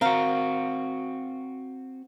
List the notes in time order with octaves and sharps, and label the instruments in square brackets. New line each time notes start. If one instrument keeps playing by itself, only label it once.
[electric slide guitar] C4 F#4 [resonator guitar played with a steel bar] A#4 F5